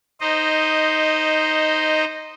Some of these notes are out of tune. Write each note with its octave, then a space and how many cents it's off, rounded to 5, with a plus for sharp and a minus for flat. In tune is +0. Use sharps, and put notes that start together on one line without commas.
D#4 +0 C5 +0 D#5 -10